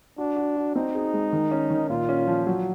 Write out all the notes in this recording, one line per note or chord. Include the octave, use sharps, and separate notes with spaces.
D4 F#4
F#4
F#4
C4 D#4
G#4
G#3
D#3
C#4
D#3
A#2 F4
C#4
F3
F#3